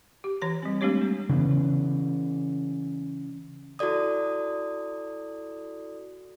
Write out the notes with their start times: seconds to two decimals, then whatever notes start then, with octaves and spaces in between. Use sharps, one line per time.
0.24 G4
0.42 E3 C#5 A#5
0.63 G3 C4
0.81 G#3 A3 C4 D4 G4 C#5
1.01 A#3
1.29 C#3 E3 B3
3.79 E4 F#4 A4 D5 D#6